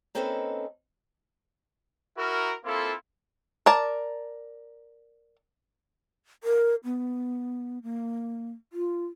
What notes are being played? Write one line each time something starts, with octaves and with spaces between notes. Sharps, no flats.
A#3 C4 C#4 D#4 A4 B4
E4 F#4 A#4
A#3 C4 E4 F4 A4
A#4 D5 A5
A#4
B3
A#3
F4